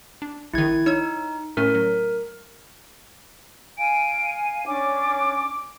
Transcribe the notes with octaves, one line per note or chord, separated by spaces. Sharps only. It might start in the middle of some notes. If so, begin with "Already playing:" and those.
D4
A#1 D#3 E4 G#6
D#4 C#5 E6 G#6
A2 A3 C#4 A#4
F#3
F5 G#5 D7
C#4 D4 D6